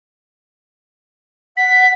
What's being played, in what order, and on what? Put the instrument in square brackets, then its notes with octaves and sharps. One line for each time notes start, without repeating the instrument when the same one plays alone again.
[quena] F#5 [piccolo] B6